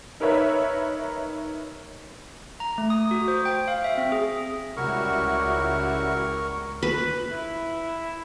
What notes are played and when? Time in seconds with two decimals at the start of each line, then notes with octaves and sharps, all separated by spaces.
0.20 D#4 A#4 B4 C#5 E5
2.60 A#5
2.78 A3
2.90 D#6
3.11 F#4
3.28 C5
3.45 G5
3.68 F5
3.84 E5
3.98 C4
4.12 G#4
4.77 C#2 G3 E4 F#4 A#4 C#6
6.83 B4
7.31 E4